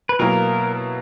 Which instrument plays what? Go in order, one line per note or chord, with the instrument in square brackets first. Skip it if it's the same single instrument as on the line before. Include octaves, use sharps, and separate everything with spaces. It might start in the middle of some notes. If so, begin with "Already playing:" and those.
[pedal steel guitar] B4
[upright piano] B2 F#3 A#3 E4 [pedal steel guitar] A#4